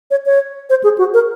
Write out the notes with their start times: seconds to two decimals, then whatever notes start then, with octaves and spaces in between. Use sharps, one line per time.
0.11 C#5
0.26 C#5
0.70 C5
0.84 G#4
0.98 F#4
1.14 A#4